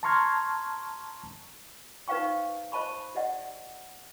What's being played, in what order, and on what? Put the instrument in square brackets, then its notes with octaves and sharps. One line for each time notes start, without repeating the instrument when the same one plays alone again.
[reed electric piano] A5 A#5 C6 C#6 F6 G#6
[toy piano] D#4 B4 C5 F5 G5 C#6
C5 D#5 A5 B5 C#6
G4 D5 D#5 F#5